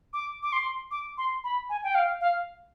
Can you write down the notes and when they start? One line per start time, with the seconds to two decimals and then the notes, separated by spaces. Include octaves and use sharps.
0.13 D6
0.43 D6
0.53 C6
0.91 D6
1.18 C6
1.44 B5
1.69 G#5
1.84 G5
1.95 F5
2.21 F5